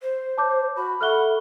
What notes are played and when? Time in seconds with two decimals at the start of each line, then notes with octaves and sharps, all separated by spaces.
0.01 C5
0.38 C#5 A5 D6 G6
0.76 F#4 B5
1.01 A4 E5 F#5 C#6 F6 F#6 G7